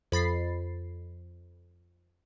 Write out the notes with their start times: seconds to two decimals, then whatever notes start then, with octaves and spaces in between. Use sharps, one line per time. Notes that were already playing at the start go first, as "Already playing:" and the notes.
0.12 F2 B5 A6 C7